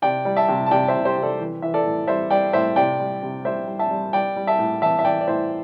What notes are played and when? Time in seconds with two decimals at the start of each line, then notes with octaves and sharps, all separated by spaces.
0.02 C3 D5 G5
0.25 G3
0.36 E5 A5
0.48 C3
0.66 A5
0.71 C3 D5 G5
0.88 C5 E5
0.94 C3
1.05 G4 C5
1.17 C3
1.22 A4 D5
1.40 E3
1.62 E3 E5
1.74 A4 D5
1.86 A2
2.07 G3 C5 E5
2.30 G3 D5 G5
2.53 A2 C5 E5
2.76 C3 D5 G5
3.00 G3
3.22 C3
3.45 G3 C5 E5
3.67 G3
3.79 E5 A5
3.90 G3
4.13 G3 D5 G5
4.36 G3
4.47 E5 A5
4.59 A2
4.82 E3 E5 A5
4.99 E5
5.05 E3 D5 G5
5.21 D5
5.27 A2 C5 E5